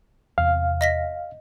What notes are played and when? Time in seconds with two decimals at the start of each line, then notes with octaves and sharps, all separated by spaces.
0.38 E2 C3 F5
0.81 D#5 A#6 B6